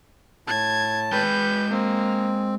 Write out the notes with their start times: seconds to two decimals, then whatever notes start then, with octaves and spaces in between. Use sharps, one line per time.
0.48 A2 A5 G#6
1.12 G#3 B4 G5 G6
1.70 A#3 C4